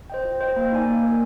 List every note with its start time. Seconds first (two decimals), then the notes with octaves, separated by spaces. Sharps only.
0.10 C5 D#5 G5
0.25 F4
0.41 C5 D#5 G5
0.56 A#3
0.72 D#4 A#4 D5 G#5
0.87 A#3
1.02 D#4 A#4 D5 G#5